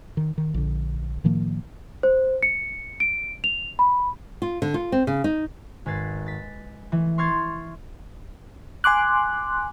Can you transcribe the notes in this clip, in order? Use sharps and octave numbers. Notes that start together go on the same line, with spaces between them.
D#3
D#3
A#1 D3
A2 D#3 F3 A#3
C5
C#7
D7
F7
B5
F4
D3
F4
C4
C#3
D#4
G#1 B4 G#6 A6 C7
A6 B6
E3 A3
C6 C#6 F6 G#6 A6 C7
G#5 C6 D6 F#6